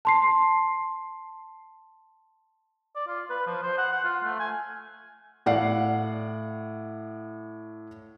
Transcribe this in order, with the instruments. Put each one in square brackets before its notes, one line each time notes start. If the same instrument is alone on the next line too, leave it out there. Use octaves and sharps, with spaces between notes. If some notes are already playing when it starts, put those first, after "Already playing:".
[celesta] A5 C6 C7
[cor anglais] D5
F4
B4
F3
C5
F#5
F#5
F4
A3
G#5
[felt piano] A2 D5 F5 F#5 C7